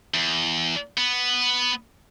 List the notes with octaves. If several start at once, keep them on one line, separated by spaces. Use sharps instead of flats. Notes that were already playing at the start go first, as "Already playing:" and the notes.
E2
B3